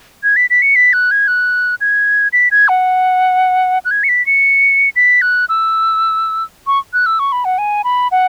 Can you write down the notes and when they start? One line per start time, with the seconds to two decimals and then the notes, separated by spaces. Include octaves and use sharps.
0.24 G#6
0.36 B6
0.50 B6
0.62 C#7
0.76 B6
0.93 F#6
1.11 G#6
1.28 F#6
1.81 G#6
2.33 B6
2.51 G#6
2.68 F#5
3.85 F#6
3.91 G#6
4.04 C#7
4.09 B6
4.26 C#7
4.96 B6
5.22 F#6
5.49 E6
6.67 C#6
6.93 F#6
7.06 E6
7.19 C#6
7.32 B5
7.45 F#5
7.58 G#5
7.84 B5
8.11 F#5